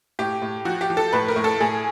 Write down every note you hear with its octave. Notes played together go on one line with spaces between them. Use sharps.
A2 G4
A2
F3 F#4
G4
F3
A4
A2 B4
A#4
A2
A4
A2 G#4